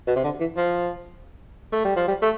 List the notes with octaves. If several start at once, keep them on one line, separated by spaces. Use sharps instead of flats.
B2
C3
D3
E3
F3
A3
G3
F3
G3
A3